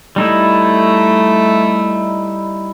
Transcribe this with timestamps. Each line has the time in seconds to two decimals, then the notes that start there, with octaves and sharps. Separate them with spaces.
0.16 G3 A3 D#4 E4